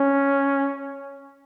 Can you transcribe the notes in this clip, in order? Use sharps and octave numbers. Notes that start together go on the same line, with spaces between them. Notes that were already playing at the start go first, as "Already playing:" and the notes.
Already playing: C#4